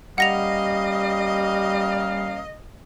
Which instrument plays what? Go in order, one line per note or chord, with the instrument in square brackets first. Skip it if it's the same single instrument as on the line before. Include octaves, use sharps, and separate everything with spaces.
[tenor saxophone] G3 [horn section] A#3 C#4 F5 [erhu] D#5 [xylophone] F#5 A#6 F7